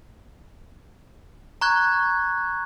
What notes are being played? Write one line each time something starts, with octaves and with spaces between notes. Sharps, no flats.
A#5 C#6 F#6 G#6